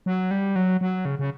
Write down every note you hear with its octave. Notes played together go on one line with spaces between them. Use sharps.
F#3
G3
F#3
F#3
C#3
C#3